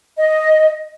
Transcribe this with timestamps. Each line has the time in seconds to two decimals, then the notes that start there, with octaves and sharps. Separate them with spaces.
0.18 D#5